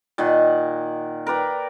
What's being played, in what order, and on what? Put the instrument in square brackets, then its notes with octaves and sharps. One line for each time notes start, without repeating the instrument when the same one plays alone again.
[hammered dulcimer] A#2 D#3 D#5 F#5
A#4 B4 D5 G5